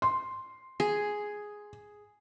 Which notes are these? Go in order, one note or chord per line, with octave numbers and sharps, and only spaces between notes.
C6
G#4